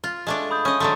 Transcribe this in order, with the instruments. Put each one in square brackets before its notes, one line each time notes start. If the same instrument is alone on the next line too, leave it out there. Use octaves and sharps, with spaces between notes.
[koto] F4
G#3 A3 D4
[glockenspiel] B5 D#6 G6
[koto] C#4 D#5
[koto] D3 F#3 A3 [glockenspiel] C6 A6